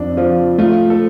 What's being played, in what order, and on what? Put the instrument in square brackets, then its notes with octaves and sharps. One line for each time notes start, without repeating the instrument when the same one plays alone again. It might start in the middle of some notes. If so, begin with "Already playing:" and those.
Already playing: [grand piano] F2 D4
F3 F4
A3 F4
A4